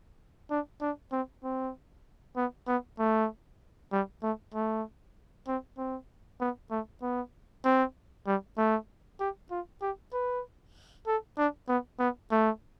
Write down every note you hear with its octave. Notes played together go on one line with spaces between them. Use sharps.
D4
D4
C4
C4
B3
B3
A3
G3
A3
A3
C4
C4
B3
A3
B3
C4
G3
A3
G4
F4
G4
B4
A4
D4
B3
B3
A3